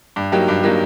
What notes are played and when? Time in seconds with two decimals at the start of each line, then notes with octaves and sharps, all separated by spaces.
0.16 G2
0.32 F#3 A#3 D#4 G4
0.48 G2
0.63 F#3 A#3 D#4 G4